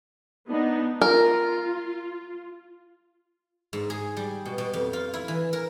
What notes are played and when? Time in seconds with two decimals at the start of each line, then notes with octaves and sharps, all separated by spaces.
0.47 B3 D4 D#4
1.02 F4 A#4
3.73 G#2
3.90 G#4
4.17 G3
4.45 B2
4.58 B2
4.73 F2
4.93 F4
5.14 E4
5.28 E3
5.53 A#4